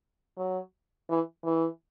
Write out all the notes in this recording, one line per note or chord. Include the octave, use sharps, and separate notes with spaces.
F#3
E3
E3